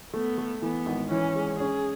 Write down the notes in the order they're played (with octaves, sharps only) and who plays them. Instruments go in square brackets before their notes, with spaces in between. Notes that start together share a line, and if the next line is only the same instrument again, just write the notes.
[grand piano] A3 [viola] B3
[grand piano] A3
[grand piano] E3 [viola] B3
[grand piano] G#1
[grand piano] E3 [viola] C#4
[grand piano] G#3
[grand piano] C#4 [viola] G#4